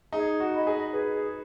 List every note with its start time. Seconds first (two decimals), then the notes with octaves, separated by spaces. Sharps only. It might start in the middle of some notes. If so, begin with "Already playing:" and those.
0.13 D#4 G#4
0.40 F#4
0.53 D#5 B5
0.67 G#4
0.93 G#4 B4